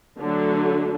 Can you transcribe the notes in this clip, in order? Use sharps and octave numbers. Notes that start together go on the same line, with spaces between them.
D3 F#3 A3